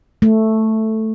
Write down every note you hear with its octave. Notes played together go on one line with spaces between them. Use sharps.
A3